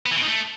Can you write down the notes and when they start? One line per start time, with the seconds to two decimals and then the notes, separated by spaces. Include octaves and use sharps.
0.06 B3
0.11 E3
0.17 B2
0.22 D#3
0.28 A3